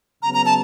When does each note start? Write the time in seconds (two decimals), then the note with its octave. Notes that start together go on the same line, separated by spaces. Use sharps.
0.22 C#3 F#3 B3 A#5
0.34 A#5
0.46 A5